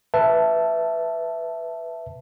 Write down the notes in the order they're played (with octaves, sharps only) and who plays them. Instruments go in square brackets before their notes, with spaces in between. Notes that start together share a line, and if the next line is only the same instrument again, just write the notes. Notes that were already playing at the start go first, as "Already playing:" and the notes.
[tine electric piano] B4 E5 A5